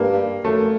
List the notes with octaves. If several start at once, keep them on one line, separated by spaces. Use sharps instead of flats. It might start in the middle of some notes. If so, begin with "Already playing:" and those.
Already playing: G2 A#3
F#2 A3